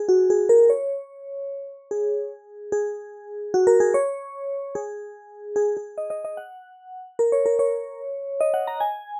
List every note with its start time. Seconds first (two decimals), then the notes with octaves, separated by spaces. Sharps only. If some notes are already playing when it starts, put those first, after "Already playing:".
Already playing: G#4
0.09 F#4
0.30 G#4
0.49 A#4
0.70 C#5
1.91 G#4
2.72 G#4
3.54 F#4
3.67 A#4
3.80 G#4
3.94 C#5
4.75 G#4
5.56 G#4
5.77 G#4
5.98 D#5
6.10 D#5
6.25 D#5
6.37 F#5
7.19 A#4
7.32 C#5
7.46 A#4
7.59 C#5
8.41 D#5
8.54 F#5
8.67 A#5
8.80 G#5